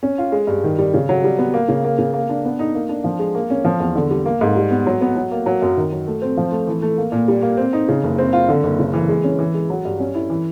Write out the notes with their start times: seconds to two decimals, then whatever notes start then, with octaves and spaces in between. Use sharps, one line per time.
0.03 C#4
0.18 F4
0.32 G#3
0.47 G2
0.64 D#3
0.79 G3
0.94 C#3
1.09 F#3
1.24 G3
1.38 B3
1.54 A#3
1.68 C#3
1.84 A#3
1.98 C#3
2.13 A#3
2.29 D4
2.45 B3
2.59 D#4
2.75 A#3
2.89 D4
3.04 F3
3.19 G#3
3.35 A#3
3.50 C#4
3.65 F3
3.80 E2
3.96 D3
4.11 G3
4.26 A#3
4.41 G#2
4.56 G3
4.71 B3
4.86 F#3
5.01 B3
5.16 F#3
5.31 A#3
5.46 F#3
5.62 F#2
5.77 D#3
5.92 F#3
6.07 A3
6.22 C4
6.37 F3
6.52 A3
6.67 E3
6.82 A3
6.98 A#3
7.12 A#2
7.28 G3
7.42 A#3
7.57 C4
7.73 D#4
7.89 C#3
8.04 F#1
8.18 C4
8.33 F4
8.49 D3
8.63 F#1
8.79 C#3
8.94 E3
9.09 G#3
9.24 C#4
9.39 E3
9.54 G#3
9.70 F#3
9.85 G2
10.00 C#4
10.14 E4
10.30 E3